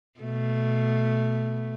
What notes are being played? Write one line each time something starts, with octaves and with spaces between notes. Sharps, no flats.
B2 A3